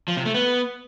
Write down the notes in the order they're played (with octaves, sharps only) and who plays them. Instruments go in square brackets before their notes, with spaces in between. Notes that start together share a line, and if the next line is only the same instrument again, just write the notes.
[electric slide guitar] F3
C3
A3
B3